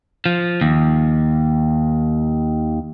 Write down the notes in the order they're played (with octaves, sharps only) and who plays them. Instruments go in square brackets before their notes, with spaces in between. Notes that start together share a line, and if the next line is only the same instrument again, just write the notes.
[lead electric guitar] F3
D#2